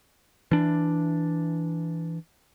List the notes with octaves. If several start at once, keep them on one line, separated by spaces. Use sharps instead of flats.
E3 D4